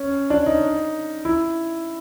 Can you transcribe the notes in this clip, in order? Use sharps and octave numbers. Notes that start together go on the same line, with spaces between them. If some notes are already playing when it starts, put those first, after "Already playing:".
Already playing: C#4
D4
D#4
E4